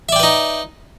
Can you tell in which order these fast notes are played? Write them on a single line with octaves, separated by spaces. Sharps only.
E5 D5 G5 B4 D#4